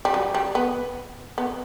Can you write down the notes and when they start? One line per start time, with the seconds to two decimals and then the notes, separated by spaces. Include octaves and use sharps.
0.05 G3
0.14 F#3
0.34 G3
0.55 B3
1.38 B3